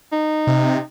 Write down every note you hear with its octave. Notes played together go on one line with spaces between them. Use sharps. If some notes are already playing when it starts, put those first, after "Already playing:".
D#4
C3